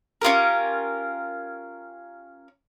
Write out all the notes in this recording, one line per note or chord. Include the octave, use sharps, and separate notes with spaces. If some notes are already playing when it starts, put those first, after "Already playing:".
C#4 F4 G4 A#4